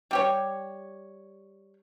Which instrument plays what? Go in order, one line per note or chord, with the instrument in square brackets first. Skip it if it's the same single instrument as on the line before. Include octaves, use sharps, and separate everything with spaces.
[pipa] G3 G4 C#5